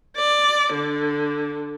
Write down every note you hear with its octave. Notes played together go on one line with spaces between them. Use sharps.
D5
D3